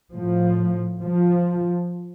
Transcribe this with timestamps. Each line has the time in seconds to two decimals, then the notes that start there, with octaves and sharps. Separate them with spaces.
0.13 A2 F3
1.01 F3